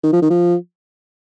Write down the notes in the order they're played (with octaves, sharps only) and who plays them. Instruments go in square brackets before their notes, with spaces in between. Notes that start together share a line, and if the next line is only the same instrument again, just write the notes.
[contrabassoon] D#3
F3
D#3
F3